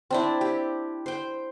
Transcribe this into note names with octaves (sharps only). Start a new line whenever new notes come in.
C4 D4 E4
G4
C5 G5